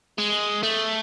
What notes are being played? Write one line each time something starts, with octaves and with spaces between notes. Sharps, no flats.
G#3
A3